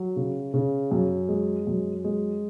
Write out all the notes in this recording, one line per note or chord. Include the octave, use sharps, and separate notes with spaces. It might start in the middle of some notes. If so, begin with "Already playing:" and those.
Already playing: F#3
C#3
C#3
F#2
G#3
F#2
G#3